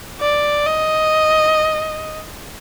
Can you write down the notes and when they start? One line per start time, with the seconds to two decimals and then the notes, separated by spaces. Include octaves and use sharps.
0.20 D5
0.66 D#5